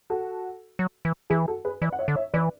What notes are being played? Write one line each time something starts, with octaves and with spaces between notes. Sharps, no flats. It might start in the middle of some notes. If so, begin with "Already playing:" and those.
F#4 A4
F#3
E3
E3 E4 G#4
F#4 A4
G#4 B4
E3 B4 D5
F#5
C#5 E5
D3
C#5 E5
E3 B4 D5